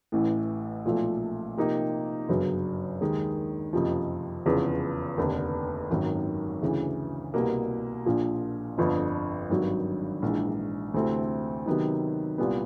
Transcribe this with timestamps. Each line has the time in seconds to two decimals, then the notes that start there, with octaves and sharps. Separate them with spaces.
0.12 A1 A2 E3
0.85 B1 A#2 F3 A3
1.57 C3 F3 A#3 D#4 G4
2.29 G1 F#2 C#3 F#3
3.01 D#2 D#3 G#3
3.73 F#1 F2 C3 F3
4.46 F1 E2 C#3 F3
5.17 F1 D#2 D3
5.90 G#1 F#2 D#3 F#3
6.62 D2 C#3 E3
7.34 C2 B2 G3 A#3
8.06 A#1 A#2 F3
8.78 G1 F2 D3 F3
9.50 G#1 G2 D#3 F#3
10.22 A#1 G#2 E3
10.94 D2 C3 E3 A3 C4
11.66 C3 D#3 F#3 B3 D#4
12.38 C2 A#2 G3 B3